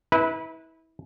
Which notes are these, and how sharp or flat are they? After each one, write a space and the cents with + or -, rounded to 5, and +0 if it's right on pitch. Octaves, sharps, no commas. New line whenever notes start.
E4 -30 B4 -10